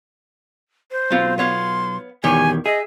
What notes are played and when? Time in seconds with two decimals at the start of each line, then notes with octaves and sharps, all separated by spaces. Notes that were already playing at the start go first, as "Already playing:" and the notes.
0.91 C5
1.10 B1 B3 C4 F4
1.38 B3 C#5 F5 C6
2.24 E2 B2 D#3 G4 C#5 G#5
2.66 G#4 D#5 E5